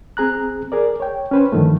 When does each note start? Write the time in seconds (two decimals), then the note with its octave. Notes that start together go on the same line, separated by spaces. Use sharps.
0.17 C4 G#4 A#5 F#6
0.72 G#4 A#4 D5
1.00 C#5 G5
1.31 C#4 B4 C5
1.52 G2 D3 D#3 F3 A3